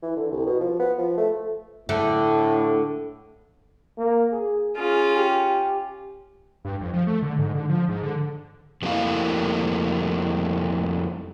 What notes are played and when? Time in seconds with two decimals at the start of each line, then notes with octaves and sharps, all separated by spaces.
0.02 E3
0.16 D3
0.31 C2
0.46 B2
0.60 F3
0.79 B3
0.98 F3
1.17 A3
1.89 A2 D3 A3
3.98 A#3
4.32 G#4
4.77 C#4 F4 G#4
5.16 G4
6.65 G2
6.81 F2
6.93 F3
7.07 A3
7.22 D3
7.39 G#2
7.55 D3
7.69 F3
7.89 G#2
8.03 D3
8.82 F2 G3 A3 A#3 E4 F5